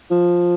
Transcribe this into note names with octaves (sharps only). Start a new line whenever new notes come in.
F3